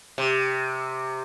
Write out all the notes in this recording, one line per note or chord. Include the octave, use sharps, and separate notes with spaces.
C3